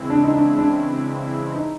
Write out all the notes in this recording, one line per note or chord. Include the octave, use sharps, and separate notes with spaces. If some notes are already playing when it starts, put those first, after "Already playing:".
Already playing: C#3 E3 G#3 C4 E4
D4
D#4
D4
D4
D#4